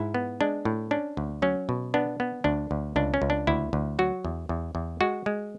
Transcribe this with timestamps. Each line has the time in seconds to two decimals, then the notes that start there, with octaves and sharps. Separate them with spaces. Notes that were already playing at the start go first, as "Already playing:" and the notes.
Already playing: G#2 E4
0.14 B3
0.41 G#3 D4
0.65 A2
0.91 C#4 D4
1.17 D2
1.42 F#3 C#4
1.69 B2
1.94 B3 D4
2.20 B3
2.44 D2 D4
2.71 D2
2.96 C#2 D4
3.14 C#4
3.22 C#2
3.30 D4
3.47 D2 E4
3.73 D2
3.99 F#3 F#4
4.25 E2
4.49 E2
4.75 E2
5.01 G#3 F#4
5.26 G#3